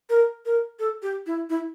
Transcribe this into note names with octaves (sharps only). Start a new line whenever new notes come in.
A#4
A#4
A4
G4
E4
E4